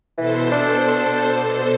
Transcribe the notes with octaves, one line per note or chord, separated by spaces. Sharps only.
B2 E3 A4 C5
D4